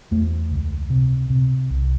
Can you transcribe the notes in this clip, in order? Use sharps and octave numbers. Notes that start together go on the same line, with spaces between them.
E2 A3
C#2
C3
C3
C2